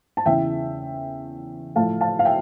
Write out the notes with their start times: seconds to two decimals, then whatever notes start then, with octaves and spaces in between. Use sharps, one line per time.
0.17 A5
0.26 E2 C#3 E3 E5 G5
1.75 A2 F3 A3 F5 A5
2.01 F5 A5
2.19 F5
2.25 E5 G5